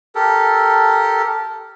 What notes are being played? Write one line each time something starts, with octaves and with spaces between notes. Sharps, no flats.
G4 A4 A#4